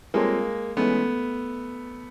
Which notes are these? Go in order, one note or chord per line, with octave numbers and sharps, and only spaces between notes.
G3 G#3 A#3 C4 F4 A4 C#5
E3 G#3 A3 B3 C#4